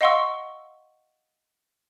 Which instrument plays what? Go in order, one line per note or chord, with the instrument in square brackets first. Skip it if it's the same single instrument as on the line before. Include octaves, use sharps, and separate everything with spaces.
[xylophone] D#5 F5 F#5 C6 C#6 E6